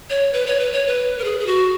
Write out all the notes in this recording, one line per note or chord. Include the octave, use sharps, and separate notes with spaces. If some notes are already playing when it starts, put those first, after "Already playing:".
C#5
B4
C#5
B4
C#5
B4
A#4
G#4
G#4
F#4